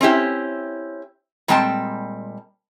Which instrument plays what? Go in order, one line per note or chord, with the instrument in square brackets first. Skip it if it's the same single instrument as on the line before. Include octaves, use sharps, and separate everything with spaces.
[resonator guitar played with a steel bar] C4 C#4 E4 G4
A#2 G3 G#3 C4 G5 A5